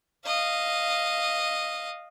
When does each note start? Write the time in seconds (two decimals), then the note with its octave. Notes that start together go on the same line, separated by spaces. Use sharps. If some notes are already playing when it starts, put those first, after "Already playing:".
0.25 D#5 F5